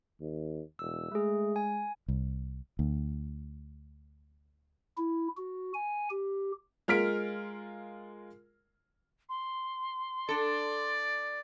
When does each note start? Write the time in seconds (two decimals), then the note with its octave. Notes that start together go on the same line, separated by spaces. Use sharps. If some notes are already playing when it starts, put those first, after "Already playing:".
0.20 D#2
0.79 E1 E6
1.11 G#3 A3 G#4
1.56 G#5
2.08 C2
2.79 D2
4.97 E4
5.37 F#4
5.74 G#5
6.10 G4
6.88 G#3 F4 A#4 F6 B6 D7
9.29 C6
10.29 D4 A4 D5